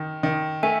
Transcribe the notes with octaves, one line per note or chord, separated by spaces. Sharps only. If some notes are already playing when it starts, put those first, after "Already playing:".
Already playing: D#3
D#3
A3 E5 G#5